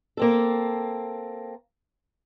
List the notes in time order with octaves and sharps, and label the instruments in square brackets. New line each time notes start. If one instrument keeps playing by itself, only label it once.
[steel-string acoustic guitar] A#3 C4 A4